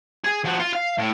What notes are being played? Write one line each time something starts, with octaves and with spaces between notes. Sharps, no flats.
G#4
F3 F#4
F4
F5
A2